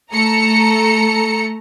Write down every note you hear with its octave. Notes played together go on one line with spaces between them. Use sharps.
A3 A4 A#5 C#7